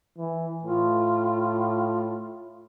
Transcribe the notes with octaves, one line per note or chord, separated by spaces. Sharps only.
E3
A2 F4